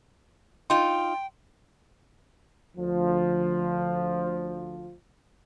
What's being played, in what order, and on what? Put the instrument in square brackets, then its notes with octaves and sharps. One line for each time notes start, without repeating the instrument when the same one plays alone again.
[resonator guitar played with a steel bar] D#4 F4 [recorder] G5 [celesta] C6
[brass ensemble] D2 F3